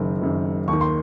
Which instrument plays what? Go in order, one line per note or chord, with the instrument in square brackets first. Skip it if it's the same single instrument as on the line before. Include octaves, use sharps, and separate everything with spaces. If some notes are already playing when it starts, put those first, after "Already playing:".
Already playing: [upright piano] F#1 F#2 D#3
F#1 F#2 D#3
D#2 D#3 C#6
C6